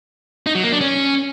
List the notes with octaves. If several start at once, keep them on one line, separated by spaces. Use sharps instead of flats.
D#4
F#3
A#3
D4
C#4